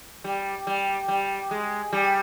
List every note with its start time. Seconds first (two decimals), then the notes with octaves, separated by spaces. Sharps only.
0.24 G3
0.67 G3
1.08 G3
1.51 G#3
1.93 G3